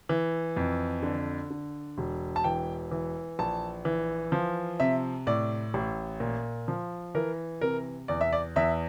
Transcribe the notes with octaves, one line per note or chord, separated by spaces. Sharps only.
E3
F2
D3
D3
E1
A5
E3 G5
E3
A#1 A5
E3
F3
C3 E5
A2 D5
A1
A#2
F3
E3 A#4
C3 A#4
E2 D5
E5
D5
E2 E5